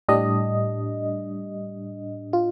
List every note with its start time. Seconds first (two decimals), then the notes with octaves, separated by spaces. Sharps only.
0.08 A2 G3 D4 D#5
2.33 F4